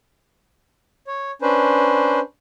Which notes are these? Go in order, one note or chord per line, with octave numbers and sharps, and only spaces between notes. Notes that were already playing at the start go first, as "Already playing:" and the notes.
C#5
C#4 D4 B4 C5